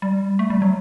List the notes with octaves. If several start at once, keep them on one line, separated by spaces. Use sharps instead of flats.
G3
A3
G3
F#3